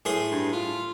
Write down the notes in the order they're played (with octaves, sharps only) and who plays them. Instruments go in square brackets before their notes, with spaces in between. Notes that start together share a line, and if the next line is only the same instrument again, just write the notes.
[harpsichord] A2 G#4 C6
[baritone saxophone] G2
F4